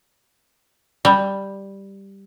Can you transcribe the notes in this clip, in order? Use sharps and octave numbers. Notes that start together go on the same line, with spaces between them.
G3